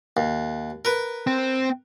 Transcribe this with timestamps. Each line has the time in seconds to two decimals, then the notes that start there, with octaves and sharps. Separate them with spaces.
0.17 D#2
0.85 A#4 B4
1.27 C4